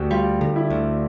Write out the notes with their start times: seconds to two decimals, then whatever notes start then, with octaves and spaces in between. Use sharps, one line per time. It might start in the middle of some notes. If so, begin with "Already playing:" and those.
Already playing: D2 F#4 G4
0.11 G3 F4
0.41 D3
0.56 E4
0.70 D2